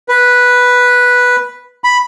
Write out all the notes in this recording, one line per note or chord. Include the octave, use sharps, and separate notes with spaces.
B4
B5